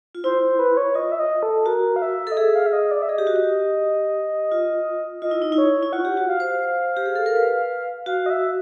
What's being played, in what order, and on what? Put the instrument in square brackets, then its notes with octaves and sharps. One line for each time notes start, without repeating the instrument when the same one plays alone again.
[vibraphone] F4
[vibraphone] E4 [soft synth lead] C5
[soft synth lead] C5
B4
C#5
[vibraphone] F4 [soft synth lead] D#5
[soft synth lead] E5
D#5
A4
[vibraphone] F#4 [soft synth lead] A#4
[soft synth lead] F5
E5
[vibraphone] A4 [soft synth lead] D#5
[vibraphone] G#4 [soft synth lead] E5
[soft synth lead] F5
E5
D#5
D5
E5
[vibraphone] G#4 [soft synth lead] D#5
[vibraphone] G4
F#4
G4
F4
[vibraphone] F4 [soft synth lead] D#5
[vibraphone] E4
D#4
E4
[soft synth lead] C#5
[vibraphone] E4
[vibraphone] F4 [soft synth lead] F#5
[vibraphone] G4
F#4
[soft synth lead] F5
[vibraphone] C5
G4
G#4
A4
A#4
B4
[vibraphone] F#4 [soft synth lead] F5
[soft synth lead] D#5
E5